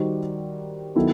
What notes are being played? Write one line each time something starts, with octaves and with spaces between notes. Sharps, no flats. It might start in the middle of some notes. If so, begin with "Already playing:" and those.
Already playing: D#3 G3 D#4 F#4 C5
D#3 F#3 B3 E4 A4